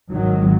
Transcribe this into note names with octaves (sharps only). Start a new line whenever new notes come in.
G#1 G#2 D#3 F#3